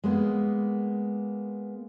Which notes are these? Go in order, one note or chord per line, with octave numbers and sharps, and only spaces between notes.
G#3 A#3 B3